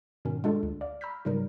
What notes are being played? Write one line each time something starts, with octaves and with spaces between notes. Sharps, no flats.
G#2 B2 D#3 C#4
G#3 A3 D4 F4 A4
D2
D5 F5
A#5 B5 E6 F6 G6 B6
G#2 C#3 F#3 G3 D#4 A#4